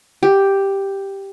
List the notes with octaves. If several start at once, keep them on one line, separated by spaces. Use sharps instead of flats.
G4